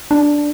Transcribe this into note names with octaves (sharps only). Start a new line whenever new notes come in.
D4